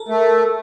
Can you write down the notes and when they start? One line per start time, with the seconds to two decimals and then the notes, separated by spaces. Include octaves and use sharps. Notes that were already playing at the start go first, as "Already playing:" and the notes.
Already playing: A4 A#4
0.08 A3